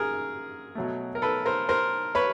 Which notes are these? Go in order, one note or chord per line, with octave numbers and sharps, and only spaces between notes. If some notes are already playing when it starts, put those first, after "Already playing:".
Already playing: F#2 G#4 A#4
B2 F#3 A3
A#4
A4 B4
A#4 C5
A#4 C5
B4 C#5